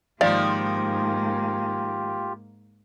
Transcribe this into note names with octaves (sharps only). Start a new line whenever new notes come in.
G#2 D#3 F3 A#3 F4 G4 D5 F5